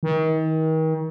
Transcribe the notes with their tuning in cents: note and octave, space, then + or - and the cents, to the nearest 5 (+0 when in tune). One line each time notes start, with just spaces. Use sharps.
D#3 +35